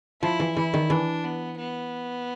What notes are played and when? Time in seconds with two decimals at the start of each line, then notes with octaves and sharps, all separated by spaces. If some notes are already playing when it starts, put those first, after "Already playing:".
0.22 F3 E4
0.40 E3
0.56 E3 E4
0.74 D#3
0.90 E3 D4
1.24 B3
1.58 B3